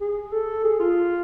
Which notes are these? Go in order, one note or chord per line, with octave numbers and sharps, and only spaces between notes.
G#4
A4
G#4
F4